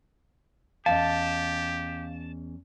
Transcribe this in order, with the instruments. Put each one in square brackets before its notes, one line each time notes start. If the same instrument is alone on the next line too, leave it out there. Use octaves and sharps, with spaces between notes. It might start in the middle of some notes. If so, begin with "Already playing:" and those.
[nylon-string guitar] E2 C#4 D#5 [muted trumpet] G4 [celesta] F5 [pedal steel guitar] A5